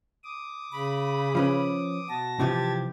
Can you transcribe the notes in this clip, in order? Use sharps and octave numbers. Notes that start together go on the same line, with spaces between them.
D6 D#6
C#3 B5
F3 C#4 B4
B2 F#4 A5 A#6
C3 E3 F3 G4 G#6 A6